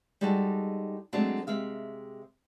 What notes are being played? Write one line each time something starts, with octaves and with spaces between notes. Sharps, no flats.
G3 G#3 D#4 F#4 G#4 A4
F#3 G#3 A3 C4 D4 F#4
C3 G#3 E5 F5